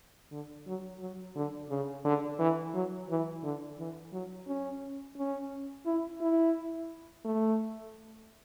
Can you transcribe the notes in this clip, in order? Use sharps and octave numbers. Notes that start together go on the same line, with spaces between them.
D3
F#3
F#3
D3
C#3
D3
E3
F#3
E3
D3
E3
F#3
C#4
C#4
E4
E4
A3